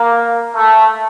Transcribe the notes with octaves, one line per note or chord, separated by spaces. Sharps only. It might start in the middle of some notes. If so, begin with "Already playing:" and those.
Already playing: A#3
A3